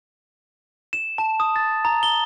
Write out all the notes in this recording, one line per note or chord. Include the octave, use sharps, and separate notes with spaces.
E7
A5
D#6
A6
A#5
G7